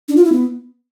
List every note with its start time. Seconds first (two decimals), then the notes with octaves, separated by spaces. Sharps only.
0.09 D4
0.16 F4
0.24 E4
0.32 B3